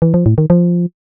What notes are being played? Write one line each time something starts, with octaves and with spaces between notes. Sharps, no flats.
E3
F3
A2
D#3
F3